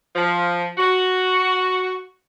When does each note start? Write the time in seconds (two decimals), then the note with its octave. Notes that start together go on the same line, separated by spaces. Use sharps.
0.15 F3
0.78 F#4